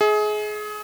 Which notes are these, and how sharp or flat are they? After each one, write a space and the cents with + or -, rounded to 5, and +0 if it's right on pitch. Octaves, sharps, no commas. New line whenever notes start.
G#4 +25 E5 -45